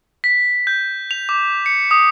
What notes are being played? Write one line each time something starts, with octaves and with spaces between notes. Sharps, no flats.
B6
G6
F7
D6
C#7
D#6